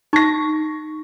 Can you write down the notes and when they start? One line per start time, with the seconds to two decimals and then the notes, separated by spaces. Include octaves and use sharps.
0.13 D#4 C#6 A#6